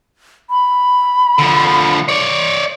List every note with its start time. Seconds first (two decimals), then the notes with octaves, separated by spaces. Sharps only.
0.50 B5
1.38 D3 F3
2.09 C#5 D5